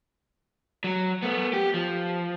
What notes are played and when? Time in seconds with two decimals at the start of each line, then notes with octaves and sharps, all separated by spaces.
0.84 F#3
1.23 A3 B3
1.53 G4
1.74 F3